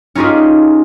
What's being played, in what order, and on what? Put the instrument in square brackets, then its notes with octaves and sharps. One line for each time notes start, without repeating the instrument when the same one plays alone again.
[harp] C#4 D#4 F4 G4 G#4